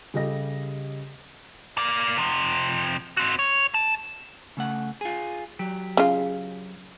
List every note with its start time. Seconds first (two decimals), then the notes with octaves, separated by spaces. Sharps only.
0.14 C#3 G3 G4 A4 D#5 A#6
1.78 A#3 D5
2.18 C3 F3
3.17 C4 F#4
3.39 C#5
3.74 A5
4.57 C#3 A3 F#5
5.01 F4 G#4
5.59 F#3 G4
5.97 C#3 F4